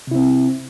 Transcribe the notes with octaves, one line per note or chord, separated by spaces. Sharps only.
C3 C4 E4